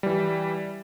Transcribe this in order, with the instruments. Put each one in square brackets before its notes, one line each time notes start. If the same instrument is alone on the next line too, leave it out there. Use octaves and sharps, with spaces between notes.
[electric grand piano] E3 G3